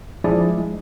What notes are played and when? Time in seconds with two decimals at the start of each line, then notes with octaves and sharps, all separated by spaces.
0.24 F3 G#3 D4 E4 G#4 D5
0.58 G#3